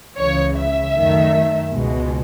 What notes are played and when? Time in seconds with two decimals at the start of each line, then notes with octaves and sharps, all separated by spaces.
0.18 C#2 C#3 E3 C#5
0.56 E5
0.94 F#2 D#3 A3
1.71 C#2 B2 G#3